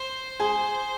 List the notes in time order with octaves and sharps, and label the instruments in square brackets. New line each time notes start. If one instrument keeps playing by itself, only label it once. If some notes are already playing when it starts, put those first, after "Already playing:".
Already playing: [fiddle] C5
[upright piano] G#4